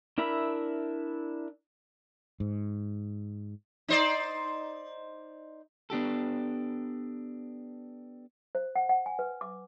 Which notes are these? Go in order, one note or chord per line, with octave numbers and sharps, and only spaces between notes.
D4 E4 A#4 E5 B5
G#2
D#4 C5 D5
B3 D4 G4 A4
C5
F#5
F#5
G#5
B4
D6